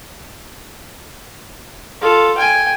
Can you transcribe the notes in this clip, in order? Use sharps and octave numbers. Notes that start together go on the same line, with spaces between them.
F4 A4
G5 G#5